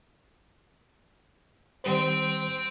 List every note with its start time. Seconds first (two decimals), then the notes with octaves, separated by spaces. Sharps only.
1.84 D#3 G3 C4 C5 G5